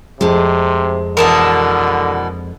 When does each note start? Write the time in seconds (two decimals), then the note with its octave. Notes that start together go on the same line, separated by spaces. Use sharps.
0.21 F2 C3 G#3
1.17 B2 D3 E3 A#4 A5 D#6